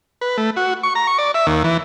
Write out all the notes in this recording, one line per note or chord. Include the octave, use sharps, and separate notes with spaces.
B4
A3
F#4
C#6
A#5
C#6
D5
E5
D#2
E3